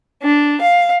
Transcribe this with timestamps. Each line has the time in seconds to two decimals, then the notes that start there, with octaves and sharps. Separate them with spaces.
0.22 D4
0.61 F5